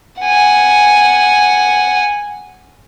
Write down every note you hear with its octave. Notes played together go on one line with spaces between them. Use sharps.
F#5 G#5